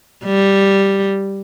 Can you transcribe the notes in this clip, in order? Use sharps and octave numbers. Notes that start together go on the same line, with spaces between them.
G3